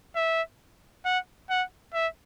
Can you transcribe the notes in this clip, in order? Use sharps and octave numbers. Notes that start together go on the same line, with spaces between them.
E5
F#5
F#5
E5